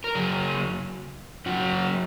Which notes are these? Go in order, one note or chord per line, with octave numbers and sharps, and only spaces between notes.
A#4
F#2 C#3 F#3 G#4
F#2 C#3 F#3 F#4